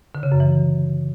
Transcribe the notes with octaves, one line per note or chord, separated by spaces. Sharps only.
D3
C#3
F#2
E3